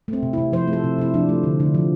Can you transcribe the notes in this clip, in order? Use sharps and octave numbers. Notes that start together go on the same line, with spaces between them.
A3 C4
C3
C3 E4
F3 C5
A3
A4
C3
C3 E4
F3 D4
A3
D3
D3
F3